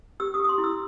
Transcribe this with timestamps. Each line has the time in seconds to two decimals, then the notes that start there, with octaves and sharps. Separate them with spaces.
0.20 G4 E6
0.34 D#6
0.39 G4
0.44 D#6
0.49 C6
0.58 E4
0.64 E6